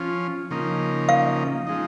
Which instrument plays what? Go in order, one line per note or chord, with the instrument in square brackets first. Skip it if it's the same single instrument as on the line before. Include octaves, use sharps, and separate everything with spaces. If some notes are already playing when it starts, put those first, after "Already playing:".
Already playing: [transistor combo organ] F3 C#4 F4
C#3 F3 A#3 D#4
[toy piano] F5
[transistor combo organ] F3 G#3 D#4